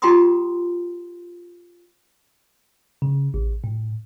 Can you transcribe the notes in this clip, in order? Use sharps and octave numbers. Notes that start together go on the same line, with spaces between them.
F4 G4 G5 A#5 C6 D#6
C#3
A1
A2